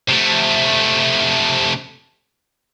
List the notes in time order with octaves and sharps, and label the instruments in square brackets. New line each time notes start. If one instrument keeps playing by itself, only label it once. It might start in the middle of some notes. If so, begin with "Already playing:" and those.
[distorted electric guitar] C3 A3